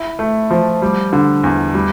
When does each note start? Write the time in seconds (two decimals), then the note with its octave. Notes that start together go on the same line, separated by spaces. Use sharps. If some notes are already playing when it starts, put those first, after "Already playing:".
Already playing: E4
0.19 A3
0.51 F3
0.82 G3
1.13 D3
1.44 E2
1.74 G3